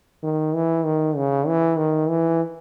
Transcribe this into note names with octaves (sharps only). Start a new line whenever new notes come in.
D#3
E3
D#3
C#3
E3
D#3
E3